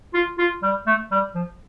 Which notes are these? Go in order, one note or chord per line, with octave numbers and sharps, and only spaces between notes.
F4
F4
G3
A3
G3
F3